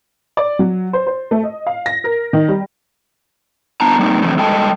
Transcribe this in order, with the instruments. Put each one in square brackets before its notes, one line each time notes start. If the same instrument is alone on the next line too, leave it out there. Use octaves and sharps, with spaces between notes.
[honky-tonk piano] D5
F#3
C5
C5
A3
D#5
F5
A#6
A#4
D#3
G3
[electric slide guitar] B3 D4 E4 A5 A#5
G3 A#3 C4 D#4
D3 E3 F3 A3 C4
G3 G#3 A4 D#5 G5 A5